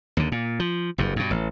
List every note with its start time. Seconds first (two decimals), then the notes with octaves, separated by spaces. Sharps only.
0.17 D#2 D3
0.32 A#2
0.60 F3
0.98 F#1 G2
1.16 G2 B2
1.31 A1